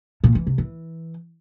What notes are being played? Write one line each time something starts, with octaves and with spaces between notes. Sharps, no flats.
A#2
E3
C3
E3